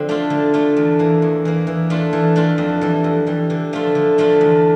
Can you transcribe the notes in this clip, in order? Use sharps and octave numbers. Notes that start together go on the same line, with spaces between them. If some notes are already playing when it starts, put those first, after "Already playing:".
Already playing: D3 F3 C4
A3 D4 F4
D3
A3 D4 F4
E2
E3 A#3
E2
E3 A#3
E3
A3 D4 F4
E3
A3 D4 F4
F2
E3 G3
F2
E3 G3
D3
F3 A3 D4 F4
D3
F3 A3 D4 F4
E2